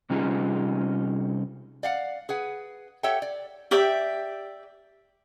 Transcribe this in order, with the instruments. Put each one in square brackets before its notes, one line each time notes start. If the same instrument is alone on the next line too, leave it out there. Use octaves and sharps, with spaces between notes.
[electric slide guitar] C3 G3 C#4 D#4 F4 G#4
[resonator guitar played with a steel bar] D5 F5 F#5
G#4 B4 F#5
G4 A4 C#5 E5 F#5 G5
D5
[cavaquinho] G4 D5 E5 G5